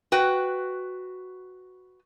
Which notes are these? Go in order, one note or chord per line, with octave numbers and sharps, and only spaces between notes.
F#4 B4 G5